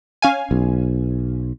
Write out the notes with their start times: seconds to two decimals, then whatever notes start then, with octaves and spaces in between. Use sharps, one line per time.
0.22 C#4 F5 G#5
0.51 B1